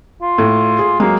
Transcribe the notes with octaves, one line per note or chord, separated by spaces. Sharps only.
F4
A2
G#4
F#3 G#3 A#3